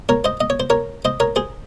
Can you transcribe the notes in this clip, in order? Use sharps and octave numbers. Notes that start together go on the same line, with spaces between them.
A#4 C#5
C5 D#5
D#5
C#5
C5
A#4 C#5
C5 D#5
A#4 C#5
G#4 C5